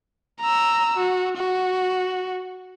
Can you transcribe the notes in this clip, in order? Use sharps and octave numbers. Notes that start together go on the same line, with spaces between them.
A#5 E6
F#4
F#4